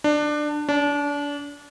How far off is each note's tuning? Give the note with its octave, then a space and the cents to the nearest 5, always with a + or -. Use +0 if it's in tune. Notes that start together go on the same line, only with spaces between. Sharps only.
D4 +20
D4 -30